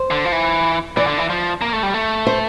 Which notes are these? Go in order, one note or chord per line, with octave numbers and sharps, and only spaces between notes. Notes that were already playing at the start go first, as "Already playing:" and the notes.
Already playing: C5
D3
F3
E3
E3 D5
D3
E3
F3
A#3
A3
G3
A3
C5